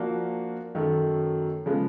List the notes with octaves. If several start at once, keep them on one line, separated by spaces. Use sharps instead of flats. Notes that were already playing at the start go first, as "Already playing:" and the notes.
Already playing: F3 A#3 D4 F#4
F#2 D#3 F#3 A3
C#3 F3 G#3 B3